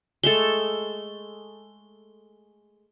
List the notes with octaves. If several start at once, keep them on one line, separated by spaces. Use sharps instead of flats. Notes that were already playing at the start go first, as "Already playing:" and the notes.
G#3 A3 A4 G7